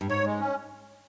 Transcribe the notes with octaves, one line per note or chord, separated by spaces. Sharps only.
G2
G#2 C#5
G#3
C#4